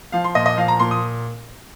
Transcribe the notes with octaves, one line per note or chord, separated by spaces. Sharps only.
F3 F5
C6
A#2 D#5
D#5
F3 F5
A#5
A#2 C6
D#6